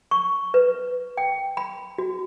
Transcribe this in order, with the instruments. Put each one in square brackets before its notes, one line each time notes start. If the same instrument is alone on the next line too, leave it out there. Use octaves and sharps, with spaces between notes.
[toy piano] C#6
B4
G5
B5
F#4